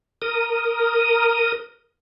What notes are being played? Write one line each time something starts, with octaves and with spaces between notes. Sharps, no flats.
A#4 D#6